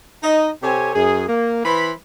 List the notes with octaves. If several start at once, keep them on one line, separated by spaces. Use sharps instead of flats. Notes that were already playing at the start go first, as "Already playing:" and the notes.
D#4 D#5
C3 C4 G4 A4 C#5 G#5
F#2 G#4
A#3
E3 B4 C5 B5